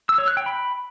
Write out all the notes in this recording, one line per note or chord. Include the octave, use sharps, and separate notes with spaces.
E6
C#5
F#6
G5
B5